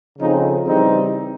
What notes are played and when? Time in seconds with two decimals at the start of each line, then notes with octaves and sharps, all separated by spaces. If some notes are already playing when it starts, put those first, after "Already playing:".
0.19 C#3 F3 A3 C4 D#4
0.67 C#3 E3 G3 C4 D#4